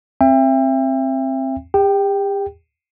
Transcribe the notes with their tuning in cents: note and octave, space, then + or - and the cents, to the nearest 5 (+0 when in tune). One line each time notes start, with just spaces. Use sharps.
C4 +20 E5 +30 G5 +30
G4 +40 G5 -5